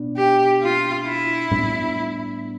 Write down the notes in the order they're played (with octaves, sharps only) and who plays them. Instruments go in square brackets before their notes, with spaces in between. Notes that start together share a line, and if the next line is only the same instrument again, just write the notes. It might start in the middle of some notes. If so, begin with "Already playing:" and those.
Already playing: [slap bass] B2 B3 D4
[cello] G4
F4
E4
[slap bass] A2 G3 B3 D4